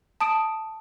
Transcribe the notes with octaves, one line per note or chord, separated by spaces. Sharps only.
A5 D#6 D7